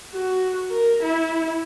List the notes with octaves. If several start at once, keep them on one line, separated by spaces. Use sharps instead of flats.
F#4
A#4
E4